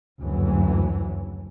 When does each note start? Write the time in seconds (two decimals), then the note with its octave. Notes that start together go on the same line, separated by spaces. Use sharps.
0.21 F#1 D2 G2 E3 F#3